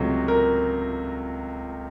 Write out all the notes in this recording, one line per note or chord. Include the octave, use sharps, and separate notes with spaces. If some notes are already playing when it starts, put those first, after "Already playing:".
Already playing: C#2 C3 F#3 A3
A#4